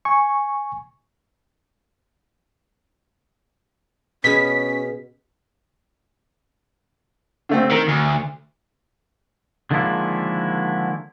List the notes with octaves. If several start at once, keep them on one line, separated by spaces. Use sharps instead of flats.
G#5 C#6
B2 C#4 G#4 B4 B6
D3 A3 C4
D#3 A#4
D2
D3 D#3 F3 G#3 A#3 E4